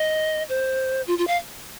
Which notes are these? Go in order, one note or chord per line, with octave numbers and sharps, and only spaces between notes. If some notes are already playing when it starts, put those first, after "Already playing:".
Already playing: D#5
C5
F4
F4
F5